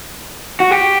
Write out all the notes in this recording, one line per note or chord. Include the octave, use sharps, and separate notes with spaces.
F#4
G4